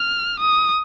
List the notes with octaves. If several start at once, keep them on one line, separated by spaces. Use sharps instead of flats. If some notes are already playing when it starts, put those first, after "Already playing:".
Already playing: F6
D#6